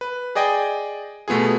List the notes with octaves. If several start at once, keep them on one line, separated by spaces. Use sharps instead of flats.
B4
G#4 D5 D#5 G5 G#5
B2 A3 B3 F4 G#4